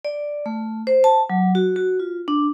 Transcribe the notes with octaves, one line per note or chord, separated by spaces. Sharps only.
D5
A3
C5
A5
F#3
F#4
F#4
F4
D4